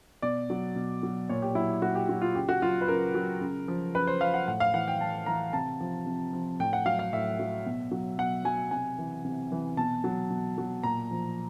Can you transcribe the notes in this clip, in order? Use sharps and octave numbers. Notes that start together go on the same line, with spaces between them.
B2 D5
F#3
B2
F#3
A#2 C#5
G4
F#3 E4
A#2 F#4
G4
F#3 F#4
F4
C#3 G4
F#4
F#3 F4
B4
C#3 A#4
F#3
C#3
F3
C#3 B4
C5
F3 F5
F#5
A2 F#5
F5
E3 F#5
G5
A2 A5
E3 A#5
C3 A5
F3
C3
F3
A2 G5
F#5
F#3 F5
F5
A2 E5
F#3
B2
F#3
B2 F#5
F#3 G#5
C3 G#5
E3
C3
E3
B2 A5
F#3
B2
F#3
A#2 A#5
F3